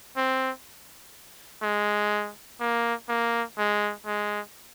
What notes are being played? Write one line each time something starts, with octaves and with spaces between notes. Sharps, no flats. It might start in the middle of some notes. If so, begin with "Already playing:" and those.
C4
G#3
A#3
A#3
G#3
G#3